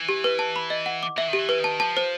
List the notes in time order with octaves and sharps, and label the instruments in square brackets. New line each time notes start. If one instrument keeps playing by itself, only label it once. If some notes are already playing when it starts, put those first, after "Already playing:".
Already playing: [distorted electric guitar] E3
[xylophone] G4
B4
A5
B5
D#5
F#5
D6
[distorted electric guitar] E3 [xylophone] E5
[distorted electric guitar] D#3
[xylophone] G4
[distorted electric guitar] E3
[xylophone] B4
[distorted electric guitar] D#3 [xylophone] A5
[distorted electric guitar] F3 [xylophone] A5
[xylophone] C5